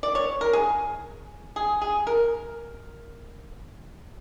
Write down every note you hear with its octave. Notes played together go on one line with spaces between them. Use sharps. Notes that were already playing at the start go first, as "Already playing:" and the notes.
D5
C#5
A#4
G#4
G#4
G#4
A#4